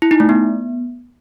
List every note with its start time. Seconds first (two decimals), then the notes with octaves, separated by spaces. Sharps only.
0.02 E4
0.11 D#4
0.20 A3
0.29 B3